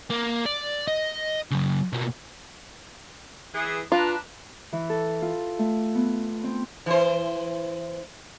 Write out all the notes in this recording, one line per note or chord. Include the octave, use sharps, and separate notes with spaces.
A#3
D5
D#5
C#3 F#3
B2 A#3
E3 G#4 E5
D4 F4 B4 A#5
E3
A4
F4
A3
B3
C4
E3 C5